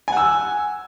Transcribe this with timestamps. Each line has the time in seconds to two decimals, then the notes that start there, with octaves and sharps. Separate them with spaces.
0.08 G#5
0.12 F#5
0.17 E6